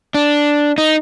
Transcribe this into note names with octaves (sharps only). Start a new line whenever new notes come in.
D4
D#4